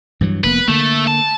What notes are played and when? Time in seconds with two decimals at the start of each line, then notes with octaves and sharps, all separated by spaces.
0.21 G2 E3 F#3
0.44 F1 A#3 B3 B4
0.68 D3 A3 A#3
1.07 A5